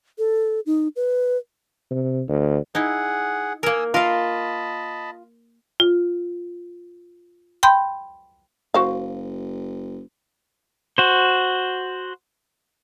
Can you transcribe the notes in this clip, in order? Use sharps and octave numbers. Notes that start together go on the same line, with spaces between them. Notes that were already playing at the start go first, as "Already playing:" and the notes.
A4
D#4
B4
C3
D2
D#4 E4 G#4 F#5
A#3 A#4 G#5 D#6 E6
F4 A#4 D#5 F5 A5 B5
F4
G5 B5 C6 G6
F#1 F#4 C5 F5
F#4 C5